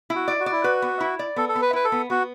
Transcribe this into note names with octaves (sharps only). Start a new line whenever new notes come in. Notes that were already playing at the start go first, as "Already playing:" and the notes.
E4
F#4
D5
F#4
D5
E4
F#4 B4
B3
E4
D5
B3 A4
A4
B3
B4
E4 B4
A4
B3
B3 F#4